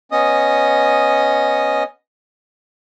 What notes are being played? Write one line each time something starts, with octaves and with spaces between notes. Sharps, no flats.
B3 C#4 D#5 D#6